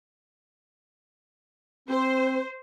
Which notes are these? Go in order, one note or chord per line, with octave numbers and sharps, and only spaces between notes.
C4 C5